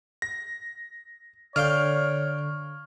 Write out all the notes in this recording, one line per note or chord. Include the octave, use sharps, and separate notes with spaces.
A#6
D3 C#5 D5 F5 G5 F6